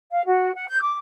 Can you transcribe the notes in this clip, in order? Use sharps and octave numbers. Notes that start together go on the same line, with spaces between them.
F5
F#4
F#5
G6
D6